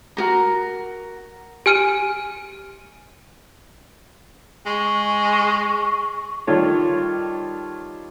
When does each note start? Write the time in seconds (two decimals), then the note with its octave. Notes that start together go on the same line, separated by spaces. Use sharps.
0.17 F#4 A#4 A#5
1.66 G4 G#5 F6 D7 D#7
4.67 G#3 C#6
6.47 D#3 G3 F4 A4 C#5